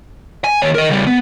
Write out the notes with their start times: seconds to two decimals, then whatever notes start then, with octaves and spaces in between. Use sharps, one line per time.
0.44 G#5
0.62 D#2 C#5
0.75 A#4 D#5
0.89 C#3 G3
1.07 B3